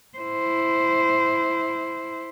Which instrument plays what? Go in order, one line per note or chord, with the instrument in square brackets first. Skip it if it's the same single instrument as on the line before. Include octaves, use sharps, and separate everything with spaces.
[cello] E4 C5